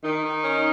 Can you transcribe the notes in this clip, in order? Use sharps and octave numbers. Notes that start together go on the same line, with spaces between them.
D#3 D#4
D#3
C#4